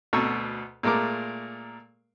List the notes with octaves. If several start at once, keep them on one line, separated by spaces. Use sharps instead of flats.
D2 B2 A4 A#5 C#6 E6
A#2 G#3 A3 A#4 D6